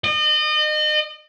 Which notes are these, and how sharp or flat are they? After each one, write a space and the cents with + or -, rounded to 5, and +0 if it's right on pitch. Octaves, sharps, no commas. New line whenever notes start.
D#5 -35